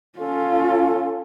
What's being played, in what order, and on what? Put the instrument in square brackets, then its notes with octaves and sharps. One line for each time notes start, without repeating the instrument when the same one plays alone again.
[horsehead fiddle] C#4 F4 [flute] A4